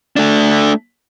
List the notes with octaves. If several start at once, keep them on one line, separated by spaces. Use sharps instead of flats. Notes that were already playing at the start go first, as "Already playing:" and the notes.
A3 D4